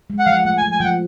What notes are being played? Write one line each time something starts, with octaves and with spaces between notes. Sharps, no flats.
G#3
F#5
F3 F5
F#5
A3 F#5
G#5
F3
G#5
F3 F#5 G5